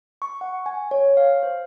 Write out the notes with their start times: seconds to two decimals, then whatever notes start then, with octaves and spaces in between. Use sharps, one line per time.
0.22 C#6
0.41 F#5
0.66 G#5
0.91 C#5
1.17 F5
1.43 C5